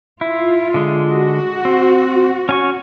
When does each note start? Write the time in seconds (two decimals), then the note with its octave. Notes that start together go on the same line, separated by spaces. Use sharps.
0.21 E4 F4
0.74 D3 G#3
1.09 F#4
1.65 C4
2.49 C#4 G#5 C#6